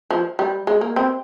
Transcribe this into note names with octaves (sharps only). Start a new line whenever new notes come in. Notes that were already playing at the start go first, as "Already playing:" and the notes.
F3
G3
G#3
A#3
C4